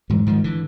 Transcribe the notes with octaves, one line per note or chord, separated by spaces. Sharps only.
G#2 E3 F#3
G#2 D#3 F3
D3 E3